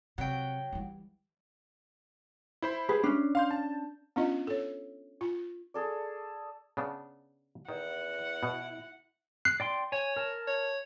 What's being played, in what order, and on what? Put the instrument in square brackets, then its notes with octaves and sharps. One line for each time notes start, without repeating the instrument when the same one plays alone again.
[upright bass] C3 [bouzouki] F#3 G5
[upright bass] E3 G3
[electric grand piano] E4 C5 B5
[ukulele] G#4 B4
C#4 D4
[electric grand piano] F5 C6 G6
A5
[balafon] B3 C#4 D4 F4 D#5
A4 C#5
F4
[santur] G#4 A4 D5
[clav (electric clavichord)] C#3 B3 D4
[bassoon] E2 [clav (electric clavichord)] D#3 [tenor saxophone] E4 [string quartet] F#5
[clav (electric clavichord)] B2
[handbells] F#6 C7
[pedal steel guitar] D5 G5 C6
[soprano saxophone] C#5 [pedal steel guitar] G#5
[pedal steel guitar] A#4 A5
[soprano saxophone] C#5